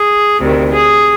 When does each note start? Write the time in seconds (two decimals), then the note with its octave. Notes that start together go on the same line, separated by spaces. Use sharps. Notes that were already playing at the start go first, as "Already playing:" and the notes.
Already playing: G#4
0.41 D2 C3 D#3
0.72 G#4